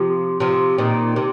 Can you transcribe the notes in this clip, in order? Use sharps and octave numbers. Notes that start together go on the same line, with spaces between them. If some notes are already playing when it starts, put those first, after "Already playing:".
Already playing: C3 F3
C3 F3
A#2 D#3
C3